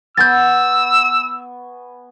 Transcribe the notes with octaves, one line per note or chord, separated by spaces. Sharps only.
B3 G#5 C#6 E6 G6 A6